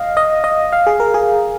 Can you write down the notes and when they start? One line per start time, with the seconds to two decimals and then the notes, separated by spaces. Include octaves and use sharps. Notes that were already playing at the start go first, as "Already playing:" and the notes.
Already playing: D#5 F5
0.17 D#5
0.44 D#5
0.73 F5
0.87 G#4
1.00 A#4
1.14 G#4